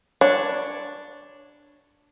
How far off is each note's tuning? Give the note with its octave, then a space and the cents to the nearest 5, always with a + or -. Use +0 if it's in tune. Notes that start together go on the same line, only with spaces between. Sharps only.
D4 +0 C#5 +0